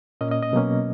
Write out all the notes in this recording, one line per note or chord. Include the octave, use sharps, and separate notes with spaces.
A#2 A#3 C#4 D#5
D#5
D#5
B2 F#3 A#3 C#4